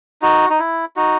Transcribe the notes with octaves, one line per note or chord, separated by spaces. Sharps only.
D#4 F#4
D#4
E4
D#4 F#4